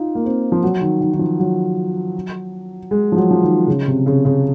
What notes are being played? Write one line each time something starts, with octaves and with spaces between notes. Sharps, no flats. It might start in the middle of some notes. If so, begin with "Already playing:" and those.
Already playing: D#4 F4
A#3
C4
F3
F#3
D#3
D#3
D#3
F3
F#3
G#3
F3
F#3
F3
D#3
C#3
C3
C#3
C#3